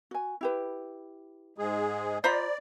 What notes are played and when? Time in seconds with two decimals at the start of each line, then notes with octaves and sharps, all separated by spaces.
0.11 F#4 G#5
0.41 E4 G4 B4
1.58 G#2 G#3 G#4
2.24 F4 C5 D5 D#5 A#5 B5